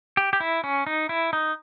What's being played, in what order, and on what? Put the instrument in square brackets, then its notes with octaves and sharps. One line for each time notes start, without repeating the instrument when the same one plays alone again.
[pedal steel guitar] G4
G4
E4
C#4
D#4
E4
D#4